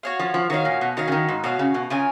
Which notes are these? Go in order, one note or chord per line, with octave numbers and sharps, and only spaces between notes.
F#4 C#5 F5
F3
F3
D#3 F#4 C#5 F5
A#2
B2
D#3 F#4 C#5 F5
C#3
D#3
G#2
B2 F#4 C#5 F5
C#3
B2
C#3 F4 A#4 C#5 G#5